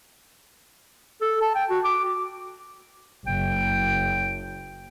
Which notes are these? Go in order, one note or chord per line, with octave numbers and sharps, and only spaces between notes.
A4
A5
G5
F#4
D6
F#1 G5